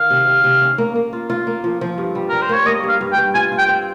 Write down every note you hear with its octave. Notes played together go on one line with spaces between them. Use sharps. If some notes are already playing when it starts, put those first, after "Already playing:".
Already playing: D#3 F5
C3
C3
C3
C#4
A#3
A#3
F4
F4
A#3
F3
F3
G2
G3
G3 A#4
C5
A#3 C#5
A#3 D#5
G2
F5
G2
G5
G2
F4 G#5
F4
G5
C4